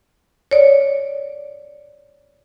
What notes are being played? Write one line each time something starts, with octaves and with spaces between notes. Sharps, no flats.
C#5 D5